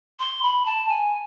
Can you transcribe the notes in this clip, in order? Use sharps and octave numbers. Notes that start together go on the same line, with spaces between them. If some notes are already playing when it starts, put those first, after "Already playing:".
C6
B5
A5
G#5